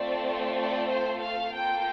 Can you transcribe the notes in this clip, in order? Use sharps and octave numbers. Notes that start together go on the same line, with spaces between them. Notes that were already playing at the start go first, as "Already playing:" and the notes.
Already playing: A3 C4 F4 A4 D5
D5
C5
F5
A#3 F4 A4 G5